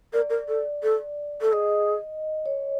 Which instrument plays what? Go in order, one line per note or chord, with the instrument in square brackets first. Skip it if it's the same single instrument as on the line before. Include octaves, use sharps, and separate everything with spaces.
[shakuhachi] A#4 [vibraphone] D5
[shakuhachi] A#4
A4
A4
A4
[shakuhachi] G#4 [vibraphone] D#5
[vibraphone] C#5